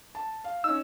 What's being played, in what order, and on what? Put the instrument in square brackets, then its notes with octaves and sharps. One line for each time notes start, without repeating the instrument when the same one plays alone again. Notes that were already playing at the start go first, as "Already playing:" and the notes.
[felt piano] A5
F5
[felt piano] C#4 D#4 [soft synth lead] E6